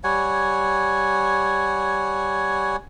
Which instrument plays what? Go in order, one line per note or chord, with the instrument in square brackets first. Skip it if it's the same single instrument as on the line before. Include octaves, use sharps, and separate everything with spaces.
[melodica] G3 C#5 F#5 G#5